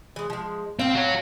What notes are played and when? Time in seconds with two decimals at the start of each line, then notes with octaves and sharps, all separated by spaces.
0.16 E3 G#3
0.30 F3 G#3
0.79 A2 C4 F5
0.95 F#4 C#5